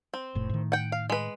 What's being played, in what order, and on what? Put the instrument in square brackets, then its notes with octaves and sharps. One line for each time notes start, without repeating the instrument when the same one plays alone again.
[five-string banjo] C4
[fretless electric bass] F1 A2
A2 D#3
[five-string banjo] F#5 G5
F5
G#3 B4